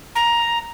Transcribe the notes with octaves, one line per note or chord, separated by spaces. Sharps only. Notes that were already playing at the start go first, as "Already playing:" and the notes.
A#5